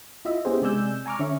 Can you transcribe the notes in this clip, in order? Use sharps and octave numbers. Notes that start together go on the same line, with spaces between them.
E4 F4 D#5 E5
B3 C#4 E4 G4 G#4 C5
C3 G#3 D5 G#5 E6 G6
G#5 A#5 C#6 D6 F6
D3 C#4 E5 C#6